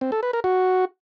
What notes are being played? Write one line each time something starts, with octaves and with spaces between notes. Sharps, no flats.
C4
A4
B4
A#4
F#4